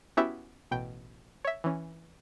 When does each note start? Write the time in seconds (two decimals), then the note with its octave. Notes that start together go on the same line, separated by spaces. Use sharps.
0.17 B3 C#4 E4 F#4 G4 E5
0.71 A1 B2 G5
1.45 C#5 E5
1.64 E3 C#4